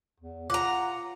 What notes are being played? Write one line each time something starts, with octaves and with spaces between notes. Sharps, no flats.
E2
F4 F#5 A#5 D6